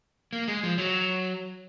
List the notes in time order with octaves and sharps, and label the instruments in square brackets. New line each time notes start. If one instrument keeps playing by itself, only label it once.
[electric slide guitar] A#3
G#3
F3
F#3